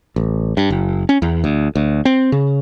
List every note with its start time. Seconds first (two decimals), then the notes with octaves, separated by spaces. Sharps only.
0.16 A1
0.57 G2
0.70 F#1
1.09 C#4
1.22 E2
1.44 D2
1.75 D2
2.05 C4
2.32 C#3